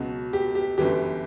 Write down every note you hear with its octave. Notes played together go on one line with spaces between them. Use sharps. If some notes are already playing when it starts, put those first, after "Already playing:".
Already playing: C#2 B2 F#3
G4
G4
G1 F#2 E3 G3 G4